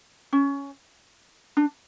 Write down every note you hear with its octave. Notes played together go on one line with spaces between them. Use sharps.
C#4
D4